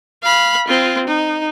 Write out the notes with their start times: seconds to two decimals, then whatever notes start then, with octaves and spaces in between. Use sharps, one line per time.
0.23 F5 B5
0.67 C4 F4
1.07 D#4